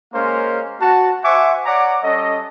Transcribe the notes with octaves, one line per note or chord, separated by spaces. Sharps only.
G#3 A#3 C#4 A#4 C5 F5
F#4 A5
C5 E5 F#5 G#5 C#6 D6
C#5 D5 F#5 A#5 D6
G3 C#4 A4 D#5